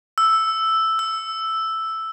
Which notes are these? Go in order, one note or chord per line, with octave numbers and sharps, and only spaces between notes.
E6
E6